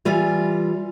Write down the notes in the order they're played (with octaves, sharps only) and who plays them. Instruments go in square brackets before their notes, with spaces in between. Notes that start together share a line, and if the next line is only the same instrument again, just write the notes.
[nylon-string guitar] E3 G3 F4 D5 G#5